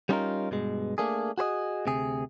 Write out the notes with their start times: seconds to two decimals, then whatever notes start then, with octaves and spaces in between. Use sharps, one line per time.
0.09 G3 B3 C#4 D#4 F4 A#4
0.51 G2 B2 G#3
0.98 A3 A#3 D4 G#4
1.38 F#4 G#4 C5 D#5
1.86 D2 C3 G#4